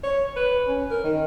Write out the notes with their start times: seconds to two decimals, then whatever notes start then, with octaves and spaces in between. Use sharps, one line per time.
0.03 C#5
0.36 B4
0.67 C#4
0.90 A#4
1.04 D#3